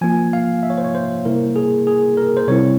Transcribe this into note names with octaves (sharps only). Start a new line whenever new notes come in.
F3 A#3 F4 G#5
F5
E5
C#5
C5
C#5
C5
C3 G3 A#3 E4 A#4
G#4
G#4
A#4
C5
C3 G3 C4 E4 C#5